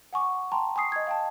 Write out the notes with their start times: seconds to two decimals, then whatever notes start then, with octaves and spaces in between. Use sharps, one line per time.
0.13 F#5 G#5 C#6 D6
0.52 G5 A5 A#5 C6
0.76 G#5 C#6 D#6 C7
0.92 D#5 G#6
1.07 F5 G5 A5